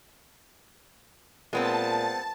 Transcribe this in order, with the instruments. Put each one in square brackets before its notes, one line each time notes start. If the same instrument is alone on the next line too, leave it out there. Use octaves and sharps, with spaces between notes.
[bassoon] A#2 [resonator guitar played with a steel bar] G#3 B3 C4 [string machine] A5